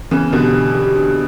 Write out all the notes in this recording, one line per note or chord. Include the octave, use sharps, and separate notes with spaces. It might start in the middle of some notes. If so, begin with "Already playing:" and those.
C#3 E3 B3
B2 D3 D4 G4 B4
D4
G4 B4
D4